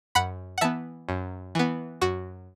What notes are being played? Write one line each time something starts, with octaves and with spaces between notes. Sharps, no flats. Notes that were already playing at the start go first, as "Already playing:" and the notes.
F#2 F#5 B5
F#5
E3 B3 E5 A5
F#2
E3 B3
F#2 F#4